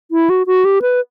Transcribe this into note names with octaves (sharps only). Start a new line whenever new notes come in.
E4
F#4
F#4
G4
B4